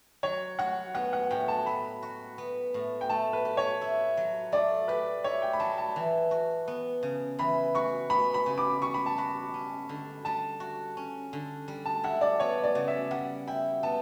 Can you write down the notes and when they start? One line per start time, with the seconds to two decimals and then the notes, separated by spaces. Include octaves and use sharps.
0.23 F#3 C#5
0.59 F#4 F#5
0.95 B3 F#5
1.13 F#5
1.31 A2 G5
1.48 A5
1.66 F#3 B5
2.03 F#4
2.38 B3
2.74 A2
3.01 G5
3.10 A3 A5
3.33 B4
3.45 G4
3.57 C#5
3.81 E4
4.17 F#3
4.52 A3 D5
4.88 G4 B4
5.24 E4 C#5
5.42 G5
5.53 B5
5.60 F#3 A5
5.78 A5
5.96 E3
6.31 F#4
6.68 B3
7.03 C#3
7.39 E3 B5
7.75 F#4 C#6
8.10 B3 B5
8.34 B5
8.46 C#3
8.58 D6
8.82 G3 C#6
8.94 B5
9.06 A5
9.18 F#4 B5
9.54 C#4
9.89 D3
10.25 G3 A5
10.60 F#4
10.97 C#4
11.33 D3
11.68 G3
11.86 A5
12.04 E4 F#5
12.21 D5
12.40 B3 C#5
12.64 D5
12.75 C#3
12.88 E5
13.11 G3 F#5
13.47 E4 G5
13.83 B3 A5